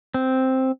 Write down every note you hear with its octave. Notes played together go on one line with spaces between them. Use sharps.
C4